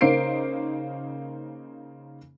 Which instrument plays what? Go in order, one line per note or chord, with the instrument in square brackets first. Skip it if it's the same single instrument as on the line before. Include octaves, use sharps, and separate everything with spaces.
[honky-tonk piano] C#3 A#3 D#4 C5 C7 D7